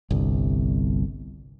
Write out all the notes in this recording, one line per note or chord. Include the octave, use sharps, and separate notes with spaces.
G1 C2